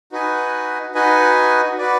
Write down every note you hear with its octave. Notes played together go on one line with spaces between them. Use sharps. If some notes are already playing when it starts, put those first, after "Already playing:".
D#4 F#4 B4 D#5 G#5
D#4 F#4 B4 D#5 G#5
F#4 B4 D5